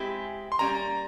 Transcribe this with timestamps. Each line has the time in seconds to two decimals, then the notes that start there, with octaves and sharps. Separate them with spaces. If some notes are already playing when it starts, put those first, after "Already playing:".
Already playing: G#3 C4 E4 G4 G#5
0.52 C6
0.59 G3 A#3 C#4 A#5